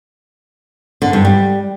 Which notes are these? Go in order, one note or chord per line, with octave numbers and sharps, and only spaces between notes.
D3
G2
G3